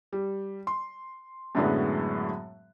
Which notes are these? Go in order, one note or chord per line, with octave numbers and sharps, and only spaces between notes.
G3
C6
F#2 A2 D3 F#3 G#3 B3